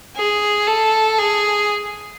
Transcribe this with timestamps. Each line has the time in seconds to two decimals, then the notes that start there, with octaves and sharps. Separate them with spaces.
0.16 G#4
0.67 A4
1.18 G#4